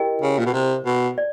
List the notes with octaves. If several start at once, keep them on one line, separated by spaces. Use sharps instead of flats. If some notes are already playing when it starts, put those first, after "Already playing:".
Already playing: E4 G4 A#4 D#5 G5
C#3
A#2
B2
C3
B2
D5